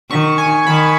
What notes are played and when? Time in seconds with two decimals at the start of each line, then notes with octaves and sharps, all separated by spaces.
0.10 D#3 C#6
0.38 G#5
0.67 D#3 B5